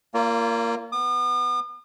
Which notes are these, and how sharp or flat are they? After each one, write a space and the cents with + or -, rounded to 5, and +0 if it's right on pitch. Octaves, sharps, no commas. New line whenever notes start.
A#3 -5 F4 -35 D5 -45
B3 +15 D#6 -45